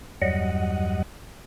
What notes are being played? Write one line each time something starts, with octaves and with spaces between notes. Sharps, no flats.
E2 G2 F#3 G3 D#5 F#5